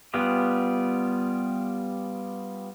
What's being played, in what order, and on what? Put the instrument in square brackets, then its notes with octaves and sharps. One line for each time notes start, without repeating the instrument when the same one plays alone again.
[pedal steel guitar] G3 B3 F4 G4 G#4